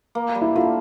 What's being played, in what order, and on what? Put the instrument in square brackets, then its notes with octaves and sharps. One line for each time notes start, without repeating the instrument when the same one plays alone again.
[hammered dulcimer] A#3
G3
[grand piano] E4
[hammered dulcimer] D3 [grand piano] F4